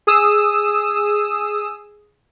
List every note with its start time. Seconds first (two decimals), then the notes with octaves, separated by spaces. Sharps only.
0.07 G#4 D#6 E6